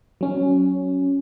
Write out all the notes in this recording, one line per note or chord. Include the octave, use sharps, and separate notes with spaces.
F#3 C#4